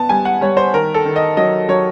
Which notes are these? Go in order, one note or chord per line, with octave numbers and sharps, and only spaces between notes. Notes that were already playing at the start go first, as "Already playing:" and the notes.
Already playing: B3 A5
G3 G#5
F#5
G3 C#5
C5
D#3 A#4
A4
D#3
D#5
F#3 D#5
F#3 C#5